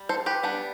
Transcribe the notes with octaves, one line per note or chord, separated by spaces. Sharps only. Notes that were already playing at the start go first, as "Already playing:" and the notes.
Already playing: G3
A4 C5
G4 B4
G3 B3 D4